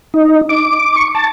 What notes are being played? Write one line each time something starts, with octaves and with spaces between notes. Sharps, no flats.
D#4
D6
C#6
A5